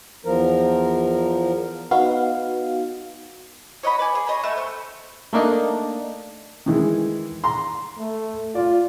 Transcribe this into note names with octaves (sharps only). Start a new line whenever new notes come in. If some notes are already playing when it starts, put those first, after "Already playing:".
E2 F3 A#4
B3 D#4 F#4 F5
C#5 D#5 F#5 B5
B4 D5 G#5
G#4
C#5 D#5 G#5 B5
A3 E5 F#5
A3 C5
A3 A#3 D4 D#4
D#3 E3 G#3
A#5 C6
A3
F4 D5